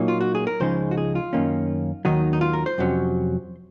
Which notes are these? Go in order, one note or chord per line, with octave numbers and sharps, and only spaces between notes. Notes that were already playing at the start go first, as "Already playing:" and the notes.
Already playing: A#2 F#3 A#3 D#4 C#5
F4
F#4
G#4
A#4
C#2 C#3 F3 G#3 D#4 C5
F#4
G#4
F4
F#2 D#3 A#3 C#4
D#2 D#3 F#3 D#4
D#4
F4
A#4
C5
F2 C3 F#3 C#4